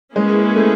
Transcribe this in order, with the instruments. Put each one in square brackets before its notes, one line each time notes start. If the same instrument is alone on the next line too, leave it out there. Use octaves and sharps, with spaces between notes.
[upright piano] G#3 [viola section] A#3 C#4 E4 G#4 B4
[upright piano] A3